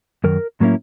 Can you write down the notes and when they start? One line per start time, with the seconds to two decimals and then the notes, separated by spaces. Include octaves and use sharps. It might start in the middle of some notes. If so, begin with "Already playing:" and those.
0.24 F#2 D#3 A#4
0.60 A2 F#3 A#3 C#4 E4